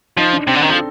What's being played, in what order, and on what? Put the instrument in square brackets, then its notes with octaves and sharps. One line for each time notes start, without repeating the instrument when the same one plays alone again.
[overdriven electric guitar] F3 [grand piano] D#4
[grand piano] D4
[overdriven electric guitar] C3 [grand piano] C4
[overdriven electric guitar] D3
[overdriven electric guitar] D#3 [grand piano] D4
[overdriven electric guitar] F3 [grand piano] A4